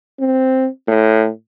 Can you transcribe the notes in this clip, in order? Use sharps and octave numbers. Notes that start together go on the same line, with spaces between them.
C4
A2